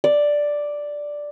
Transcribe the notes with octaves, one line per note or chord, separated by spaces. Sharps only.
D5